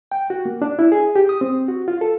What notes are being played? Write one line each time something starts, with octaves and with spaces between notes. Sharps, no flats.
G5
F#4
A#3
D4
E4
G#4
G4
D#6
C4
F#4
F4
A4